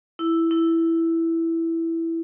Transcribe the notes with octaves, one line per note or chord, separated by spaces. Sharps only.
E4
E4